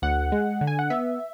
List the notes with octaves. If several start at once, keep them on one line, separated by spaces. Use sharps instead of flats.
D2 F#5
G#3
D3
G#5
F#5
B3 E5